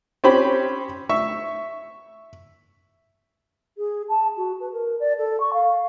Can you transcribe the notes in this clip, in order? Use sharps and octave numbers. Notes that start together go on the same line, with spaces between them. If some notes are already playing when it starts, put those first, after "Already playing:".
C4 C#4 G4 C5 B5
E5 C#6
G#4
A5
F#4
B4
A#4
D5
A4
C#6
F5